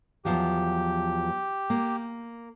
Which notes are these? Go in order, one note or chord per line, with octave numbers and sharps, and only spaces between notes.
E2 F3 F#3 G4
A#3